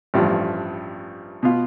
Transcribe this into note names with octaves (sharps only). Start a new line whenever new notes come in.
A1 G2 F3
B2 B3 F4